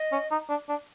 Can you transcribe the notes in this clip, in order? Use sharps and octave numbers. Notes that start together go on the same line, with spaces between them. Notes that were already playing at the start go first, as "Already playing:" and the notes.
Already playing: D#5
C#4
D#4
D4
D4